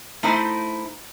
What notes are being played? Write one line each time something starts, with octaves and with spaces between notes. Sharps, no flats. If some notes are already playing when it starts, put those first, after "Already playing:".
A3 D#4 E4 C5